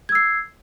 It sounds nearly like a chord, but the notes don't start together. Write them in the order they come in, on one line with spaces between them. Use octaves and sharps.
G#6 E6 C7